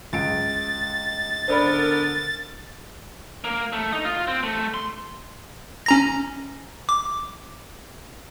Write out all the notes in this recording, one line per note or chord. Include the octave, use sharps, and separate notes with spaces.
C#2 A6 D7
D3 B3 A#4 C5 D5 B5
A#3
A3
D#4
F4
C4
A3
C6
C#4 A#5 A#6
D6